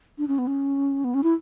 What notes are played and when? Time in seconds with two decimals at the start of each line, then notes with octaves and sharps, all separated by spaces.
0.18 D4
0.28 C#4
0.38 B3
0.47 C#4
1.04 B3
1.14 C#4
1.24 E4